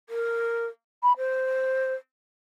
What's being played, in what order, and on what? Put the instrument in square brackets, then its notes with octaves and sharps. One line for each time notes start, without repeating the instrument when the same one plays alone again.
[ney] A#4
B5
C5